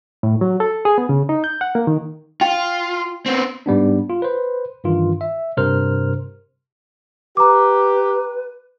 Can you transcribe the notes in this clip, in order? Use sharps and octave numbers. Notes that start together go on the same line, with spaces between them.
A2
F#3
A4
G#4
B3
C#3
D#4
G6
F#5
A#3
D#3
F4 G5
B3 C4
G#2 G3 B3 D4
F4
B4 C5
G2 D#3 E3 F4
E5
G2 C3 A#4 C5 F6
G4 B4 A#5 D6